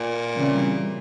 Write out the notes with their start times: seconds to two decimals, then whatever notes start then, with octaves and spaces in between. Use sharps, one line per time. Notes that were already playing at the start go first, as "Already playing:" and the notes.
Already playing: A#2
0.35 C#3 E3 G3 C4